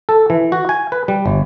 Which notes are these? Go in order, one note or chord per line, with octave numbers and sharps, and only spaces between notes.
A4
E3
F#4
G#5
B4
G3
G1